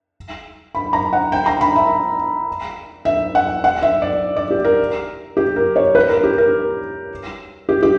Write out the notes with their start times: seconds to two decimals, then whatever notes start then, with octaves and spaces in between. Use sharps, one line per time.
0.75 B5
0.93 A#5
1.13 F#5
1.32 G5
1.46 A#5
1.61 B5
1.76 E5
3.05 E5
3.35 F#5
3.64 F#5
3.82 E5
4.02 D5
4.36 D5
4.51 G4
4.65 A#4
5.37 G4
5.56 A#4
5.76 C#5
5.95 B4
6.09 A#4
6.24 G4
6.38 A#4
7.69 G4
7.83 G4